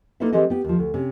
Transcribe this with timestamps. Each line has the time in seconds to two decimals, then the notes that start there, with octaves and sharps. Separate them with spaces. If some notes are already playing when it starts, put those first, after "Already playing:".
0.20 A#3 D#4 A4 B4 C5 E5
0.32 E3 G#3 C4 G4 A4 D#5
0.50 B3 G4
0.64 D#2 F3
0.79 D2
0.94 C3 C#4